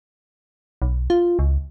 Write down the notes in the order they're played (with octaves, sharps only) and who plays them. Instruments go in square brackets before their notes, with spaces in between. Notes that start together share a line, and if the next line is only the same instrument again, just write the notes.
[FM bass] B1
F4
C#2